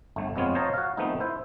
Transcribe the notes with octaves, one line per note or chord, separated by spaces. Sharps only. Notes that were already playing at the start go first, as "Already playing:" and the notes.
G1 A3
F2 G#3 B3 C4 F4 C#5
C5 C#5 D#5 F5 A5 A#5
F#4 F5
D#3 F3 A3 B3 C4 D#4
E4 C5 E5